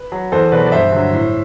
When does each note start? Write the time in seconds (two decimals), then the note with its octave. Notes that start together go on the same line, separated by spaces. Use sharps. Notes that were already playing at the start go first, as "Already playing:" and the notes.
Already playing: B4
0.12 F#3
0.32 E2 A4 C5
0.52 B2 F#3 B4 D5
0.66 D5
0.72 G2 C5 E5
0.92 D3 F#3
1.13 A2